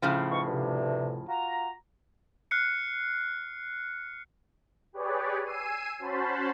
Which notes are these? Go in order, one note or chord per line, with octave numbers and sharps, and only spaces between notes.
A2 C#3 F3
B3 D#4 C#6
D2 G2 C3
F4 F#4 A#5
F6 F#6 C7 C#7
G4 G#4 B4 C#5 D5
G#5 E6 C7 D#7
C#4 F#4 C5 A5 B5 C6